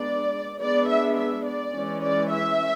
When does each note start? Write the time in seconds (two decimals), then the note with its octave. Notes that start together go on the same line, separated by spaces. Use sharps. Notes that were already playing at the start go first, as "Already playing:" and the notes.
Already playing: G#3 B3 D4 D5
0.61 G#3 B3 D4 D5
0.89 E5
1.18 E5
1.46 D5
1.74 E3 G#3 C#4
2.02 D5
2.30 E5